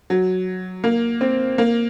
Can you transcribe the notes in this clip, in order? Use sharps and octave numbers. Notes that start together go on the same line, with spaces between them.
F#3
A#3
C4
A#3